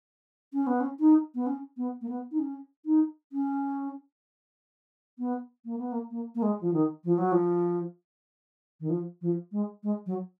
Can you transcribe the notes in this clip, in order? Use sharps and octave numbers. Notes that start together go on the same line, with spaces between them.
C#4
B3
C#4
D#4
B3
C#4
B3
A#3
B3
D#4
C#4
D#4
C#4
B3
A#3
B3
A#3
A#3
A#3
G#3
F3
D#3
F3
F#3
F3
D#3
F3
F3
G#3
G#3
F#3